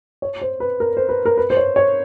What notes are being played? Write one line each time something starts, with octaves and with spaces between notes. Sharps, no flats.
C#5
C5
B4
A#4
C5
B4
A#4
B4
C5
C#5
C#5